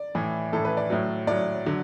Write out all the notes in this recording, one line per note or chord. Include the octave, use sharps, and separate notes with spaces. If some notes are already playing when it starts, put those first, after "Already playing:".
Already playing: D5
A2 E3
A2 E3 A4
B4
D5
A2 F#3
A2 F#3 D5
D3 F#3